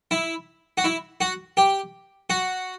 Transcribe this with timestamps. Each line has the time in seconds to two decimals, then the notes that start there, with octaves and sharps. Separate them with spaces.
0.11 E4
0.77 F#4
0.84 E4
1.21 F#4
1.57 G4
2.30 F#4